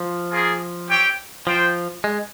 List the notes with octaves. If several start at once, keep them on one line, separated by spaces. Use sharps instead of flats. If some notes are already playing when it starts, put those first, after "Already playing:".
Already playing: F3
A#3 F4 G#4
C4 G4 C#5 G5
F3 F4 C5 G5
G#3